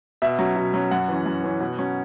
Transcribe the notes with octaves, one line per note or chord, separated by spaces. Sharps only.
B2 E5
F#3 C#4
B2
F#3 C#4
F#2 F#5
E3 C#4
F#2
E3 C#4
B2
F#3 C#4